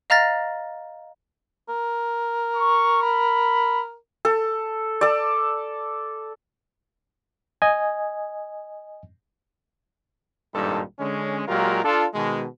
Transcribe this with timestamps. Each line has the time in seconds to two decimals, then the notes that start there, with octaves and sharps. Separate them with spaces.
0.10 D#5 F5 A#5 F6 A6 A#6
1.69 A#4
2.56 C#6
3.02 B5
4.25 A4
5.01 A4 D5
7.62 D#5 G#5
10.54 G#1 G2 A#2 G3 D#4 A4
10.99 D3 G#3 C#4
11.48 A#2 F#3 G#3 F4 G4 A#4
11.85 D4 F4 A4
12.14 B2 D#3 G#3